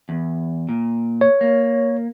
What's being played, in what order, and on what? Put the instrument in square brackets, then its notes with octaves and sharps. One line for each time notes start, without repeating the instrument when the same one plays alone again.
[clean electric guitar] E2
A#2
[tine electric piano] C#5
[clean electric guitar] A#3